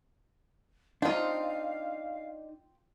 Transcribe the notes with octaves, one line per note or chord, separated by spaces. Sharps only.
C4 D4 D#4 F4 F5